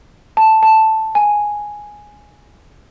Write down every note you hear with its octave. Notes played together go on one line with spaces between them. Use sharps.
A5
A5
G#5